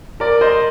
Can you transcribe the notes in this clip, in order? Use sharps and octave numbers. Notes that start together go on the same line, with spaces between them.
A#4 D5
C5 D#5